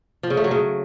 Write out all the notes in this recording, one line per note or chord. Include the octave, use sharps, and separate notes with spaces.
F3
C#3
A3
F#3
C#3